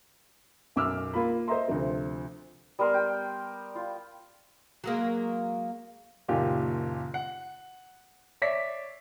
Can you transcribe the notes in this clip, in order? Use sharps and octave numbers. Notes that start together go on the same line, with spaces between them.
B1 F#2 D6 E6 F6
A#3 F4 B5
C5 D#5 E5 A#5 C6
D2 C3 F3 C4
G3 B3 A#4 C6
G5
F4
F#3 G#3 A#3
F#1 A#2 D#3 F4 G4
F#5
C#5 D5 E5 D6 B6 C7